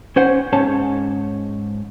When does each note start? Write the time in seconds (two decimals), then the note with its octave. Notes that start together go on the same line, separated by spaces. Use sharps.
0.16 C#4 C5 F#5
0.53 G#2 C#4 C#5 A5